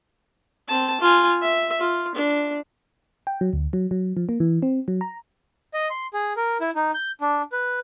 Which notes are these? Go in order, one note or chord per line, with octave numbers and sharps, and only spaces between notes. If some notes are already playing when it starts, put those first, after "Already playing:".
C4 A5
F4 G#5
E5
F4
D4
G5
F#3
D2
F#3
F#3
F3
A#3
E3
C4
F#3
A#5
D#5
C6
G#4
A#4
E4
D#4
G6
D4
B4